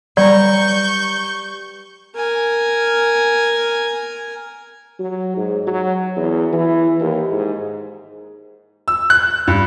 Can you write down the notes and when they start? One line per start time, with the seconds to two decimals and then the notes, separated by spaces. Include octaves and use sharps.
0.17 G3 B4 D5 A#5 C#6 G6
2.15 A#4 G#5
4.99 F#3
5.37 G#2
5.67 F#3
6.16 E2
6.53 E3
7.00 D#2
7.32 G#2
8.88 E6
9.10 F#6
9.48 G2